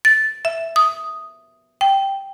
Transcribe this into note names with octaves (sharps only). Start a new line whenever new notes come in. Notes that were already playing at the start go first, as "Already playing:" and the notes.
A6
E5
D#6
G5